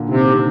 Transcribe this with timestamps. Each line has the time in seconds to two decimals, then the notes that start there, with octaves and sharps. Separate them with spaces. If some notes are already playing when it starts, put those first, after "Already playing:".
Already playing: A#2 D3
0.09 C3 D#3
0.23 D3